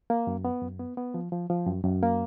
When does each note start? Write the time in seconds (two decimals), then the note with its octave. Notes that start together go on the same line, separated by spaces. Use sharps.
0.10 A#3
0.27 F#2
0.45 B3
0.62 F#2
0.79 B3
0.97 B3
1.14 F3
1.32 F3
1.50 F3
1.67 F#2
1.84 F#2
2.02 A#3